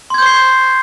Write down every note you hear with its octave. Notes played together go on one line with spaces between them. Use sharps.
C6 C#6 G6 G#6 C7